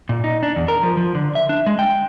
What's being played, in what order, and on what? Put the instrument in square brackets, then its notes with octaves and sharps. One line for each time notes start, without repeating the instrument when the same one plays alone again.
[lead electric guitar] A#2
D#4
D4
E2
A#4
F3
F3
D3
E5
D4
G#3
G5